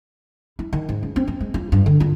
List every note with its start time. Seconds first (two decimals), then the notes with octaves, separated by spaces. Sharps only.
0.59 E4
0.73 D#3
0.89 G#2
1.03 C#2
1.16 C4
1.28 C4
1.40 G#3
1.54 F4
1.72 G2
1.86 D3
2.00 F4